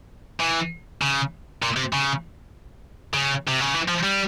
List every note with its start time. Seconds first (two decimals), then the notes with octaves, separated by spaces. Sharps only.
0.40 E3
1.02 C#3
1.63 A#2
1.76 C3
1.93 C#3
3.14 C#3
3.47 C3
3.60 C#3
3.74 E3
3.88 F3
4.04 G3